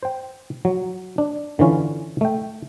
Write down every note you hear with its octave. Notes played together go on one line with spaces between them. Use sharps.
C5 G5
F#3
D4
D3 E3 C#4 F4
A3 G5